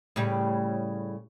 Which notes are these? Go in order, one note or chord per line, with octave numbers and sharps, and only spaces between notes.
A2 C#3 G3